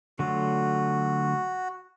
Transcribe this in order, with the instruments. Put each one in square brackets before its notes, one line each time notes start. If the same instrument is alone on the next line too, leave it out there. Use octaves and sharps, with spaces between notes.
[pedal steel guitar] D3 F#3 A3 F4 [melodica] F#4